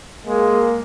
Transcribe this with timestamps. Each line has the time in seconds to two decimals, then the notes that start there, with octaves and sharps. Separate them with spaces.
0.27 G#3 A#3